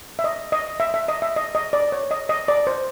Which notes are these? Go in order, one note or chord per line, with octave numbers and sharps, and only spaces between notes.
E5
D#5
D#5
E5
E5
D#5
E5
D#5
D#5
D5
C#5
D#5
D#5
D5
C5